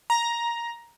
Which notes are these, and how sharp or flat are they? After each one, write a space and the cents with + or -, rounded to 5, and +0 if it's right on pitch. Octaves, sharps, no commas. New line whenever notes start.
A#5 +10